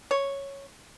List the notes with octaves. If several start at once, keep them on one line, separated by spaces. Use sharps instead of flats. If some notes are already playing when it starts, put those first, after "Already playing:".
C#5